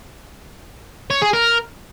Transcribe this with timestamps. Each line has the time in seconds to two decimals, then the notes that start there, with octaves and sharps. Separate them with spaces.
1.10 C#5
1.22 G#4
1.33 A#4